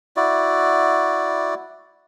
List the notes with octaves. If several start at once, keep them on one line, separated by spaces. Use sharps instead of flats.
E4 F#4 D5